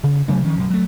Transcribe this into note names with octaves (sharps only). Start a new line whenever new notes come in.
C#3
C3 F#3 A3 D4
D#3 F3 C#4
B1 F#2
F#3 A3